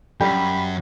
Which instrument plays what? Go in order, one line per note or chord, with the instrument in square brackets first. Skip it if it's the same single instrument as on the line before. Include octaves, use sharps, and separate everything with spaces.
[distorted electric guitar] F#2 [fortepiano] G3 G4 [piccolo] B5